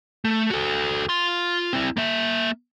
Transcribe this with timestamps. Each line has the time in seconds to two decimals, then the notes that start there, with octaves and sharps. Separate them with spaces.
0.25 A3
0.50 F#4 A4
1.09 F4 C6
1.73 C4 E4
1.97 A#3 E5